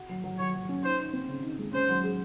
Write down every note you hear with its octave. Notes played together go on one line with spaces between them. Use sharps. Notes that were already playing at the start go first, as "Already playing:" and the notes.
Already playing: F#4
F#3
F#3
F#3 C#5
F#3
C#4
D#4 C5
D#4
C4
C#3
D#4
G#3
C#4 C5
F#3
G#4